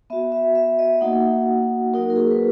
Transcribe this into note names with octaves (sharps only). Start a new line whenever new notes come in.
B3 F#4 E5
E5
E5
D#5
A#3 D#4 F#4 F#5
F#3 A#3 D#4 F#4 A#4
A#4
G#4
B4